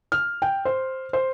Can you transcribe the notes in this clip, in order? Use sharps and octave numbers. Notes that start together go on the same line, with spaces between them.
F6
G5
C5
C5